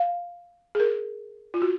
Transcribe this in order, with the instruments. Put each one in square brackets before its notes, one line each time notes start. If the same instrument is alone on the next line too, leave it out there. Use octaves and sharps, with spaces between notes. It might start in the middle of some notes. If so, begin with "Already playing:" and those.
Already playing: [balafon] F5
G#4
A#4
F4
F#4